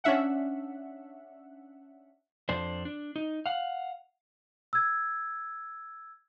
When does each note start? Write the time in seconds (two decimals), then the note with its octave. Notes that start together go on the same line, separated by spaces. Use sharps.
0.04 C#4 D4 E5 F#5
2.49 F2 D4 C5
2.85 D4
3.16 D#4
3.46 F5 F#5
4.73 E6 G#6